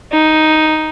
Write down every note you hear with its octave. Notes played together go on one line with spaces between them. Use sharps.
D#4